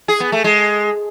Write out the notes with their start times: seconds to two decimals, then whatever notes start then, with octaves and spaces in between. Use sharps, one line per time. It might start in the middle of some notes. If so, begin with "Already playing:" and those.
0.08 G#4
0.20 B3
0.32 A3
0.44 G#3